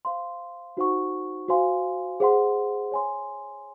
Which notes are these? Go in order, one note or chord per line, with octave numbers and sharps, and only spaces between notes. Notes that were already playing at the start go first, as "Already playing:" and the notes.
C5 F5 C6
D#4 F#4 C5 F#5 C#6
F#4 C5 F5 G#5 C6
G#4 C5 F#5 C6
C#5 G#5 C6